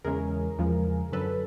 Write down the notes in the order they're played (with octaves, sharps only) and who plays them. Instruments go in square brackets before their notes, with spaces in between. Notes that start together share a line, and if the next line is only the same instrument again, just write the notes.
[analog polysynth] E2 C#3 E3 G#3 C#4 G#4 A#4
E2 C#3 F3 G#3
F#2 D3 F#3 A4 B4